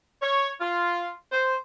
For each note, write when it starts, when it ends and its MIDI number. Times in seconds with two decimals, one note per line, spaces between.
0.22 0.51 73
0.61 1.10 65
1.32 1.55 72